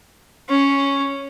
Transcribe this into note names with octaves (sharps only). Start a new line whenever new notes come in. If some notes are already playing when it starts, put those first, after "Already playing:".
C#4